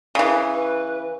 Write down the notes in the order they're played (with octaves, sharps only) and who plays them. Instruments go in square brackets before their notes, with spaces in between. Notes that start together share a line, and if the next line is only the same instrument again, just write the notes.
[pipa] C#3 E3
[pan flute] B4